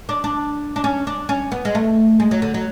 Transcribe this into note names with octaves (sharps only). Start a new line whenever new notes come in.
D4
D4
D4
C#4
D4
C#4
B3
G#3
A3
G#3
F#3
D3
F#3